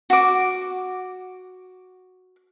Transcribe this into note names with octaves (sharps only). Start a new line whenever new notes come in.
F#4 D6